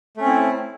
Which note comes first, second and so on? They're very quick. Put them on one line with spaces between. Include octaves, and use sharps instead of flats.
A3 C#4 C4 E4